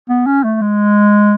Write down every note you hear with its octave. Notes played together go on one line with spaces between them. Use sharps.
B3
C#4
A3
G#3